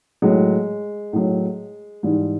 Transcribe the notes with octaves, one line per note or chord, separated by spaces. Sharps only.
A2 F#3 G#3
A2 F#3
G#2 E3 G3